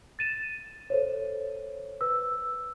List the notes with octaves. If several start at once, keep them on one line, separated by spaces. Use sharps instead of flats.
A6 D#7 E7
A4 C5 C#5
B4 E6